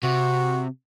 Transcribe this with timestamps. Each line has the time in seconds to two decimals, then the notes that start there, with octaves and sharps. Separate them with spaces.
0.03 C3 F#4